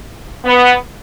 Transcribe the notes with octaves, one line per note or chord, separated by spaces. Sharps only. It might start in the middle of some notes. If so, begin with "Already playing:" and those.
B3